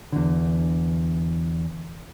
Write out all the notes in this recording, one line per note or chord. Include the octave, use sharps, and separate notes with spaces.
E2 D3